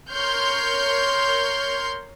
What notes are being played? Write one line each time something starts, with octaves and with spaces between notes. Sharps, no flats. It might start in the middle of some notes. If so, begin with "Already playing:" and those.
A#4 C#5 C6 F6 G6